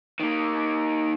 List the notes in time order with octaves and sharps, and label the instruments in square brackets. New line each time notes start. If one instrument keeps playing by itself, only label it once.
[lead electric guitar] D#3 A#3